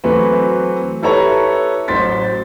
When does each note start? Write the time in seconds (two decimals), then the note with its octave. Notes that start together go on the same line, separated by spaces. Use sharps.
0.04 E3 F#3 A3 C4 B4
1.02 E4 G4 A4 B4 C#5 A#5
1.88 A1 F#3 C5 C6 A6 B6